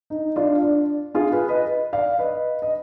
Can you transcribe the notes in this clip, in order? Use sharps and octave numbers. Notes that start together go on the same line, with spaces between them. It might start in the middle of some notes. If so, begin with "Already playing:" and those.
D#4
D4 F4
D4
F4 G#4
G#4 B4
B4 D#5
D5 F5
B4 D#5
D#5